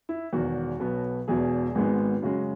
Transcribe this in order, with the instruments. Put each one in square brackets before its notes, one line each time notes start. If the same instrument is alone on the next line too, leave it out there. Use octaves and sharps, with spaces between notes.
[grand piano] E4
E1 E2 D#3 F#4
B1 B2 F#3 B3
E1 E2 B2 G#4
G#1 G#2 D#3 G#3 B3
F#2 C#3 G#3 F#4